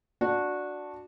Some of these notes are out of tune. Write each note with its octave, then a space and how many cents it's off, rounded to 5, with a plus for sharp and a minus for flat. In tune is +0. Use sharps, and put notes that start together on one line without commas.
D4 +0 F#4 -15